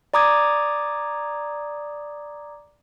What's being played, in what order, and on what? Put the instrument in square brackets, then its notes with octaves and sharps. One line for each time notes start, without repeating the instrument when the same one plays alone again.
[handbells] D5 A#5 D6 D#6 G#6